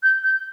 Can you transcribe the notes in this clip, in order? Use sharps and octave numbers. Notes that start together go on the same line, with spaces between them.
G6
G6